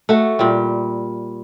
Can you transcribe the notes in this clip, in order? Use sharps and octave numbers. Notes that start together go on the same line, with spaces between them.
A3 F#4
A#2 G3